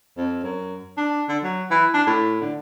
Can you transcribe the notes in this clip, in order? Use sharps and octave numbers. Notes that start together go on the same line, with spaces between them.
F2
F#2
D4
D3
F#3
E3
D4
A2
D3